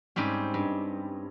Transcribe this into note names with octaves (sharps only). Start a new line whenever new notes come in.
G#2 G3 C4 C#4
G2